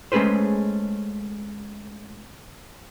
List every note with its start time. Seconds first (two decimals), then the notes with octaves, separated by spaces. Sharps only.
0.12 G#3 A3 C#4 G#4 B4 C5